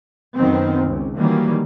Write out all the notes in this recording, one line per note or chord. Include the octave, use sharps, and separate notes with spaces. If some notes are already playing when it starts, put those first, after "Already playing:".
F#2 D#3 B3 C4
C#2
D#3 E3 F#3 G3 A#3